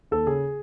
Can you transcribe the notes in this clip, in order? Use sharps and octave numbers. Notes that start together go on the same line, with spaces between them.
D#2 A4
C#3 G#4